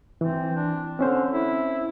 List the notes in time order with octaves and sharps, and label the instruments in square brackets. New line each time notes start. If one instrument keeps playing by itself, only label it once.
[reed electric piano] E3 [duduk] C4
[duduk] D4
[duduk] D3 [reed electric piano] C4 C#4 C5
[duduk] E4